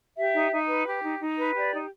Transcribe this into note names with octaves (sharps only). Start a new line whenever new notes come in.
G4 E5
D#4
D#4
B4
G4
D#4
D#4
B4
G4 D5
D#4